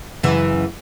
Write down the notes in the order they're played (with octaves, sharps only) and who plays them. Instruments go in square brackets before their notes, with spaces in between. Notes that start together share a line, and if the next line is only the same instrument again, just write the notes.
[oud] F#2 C#3 E3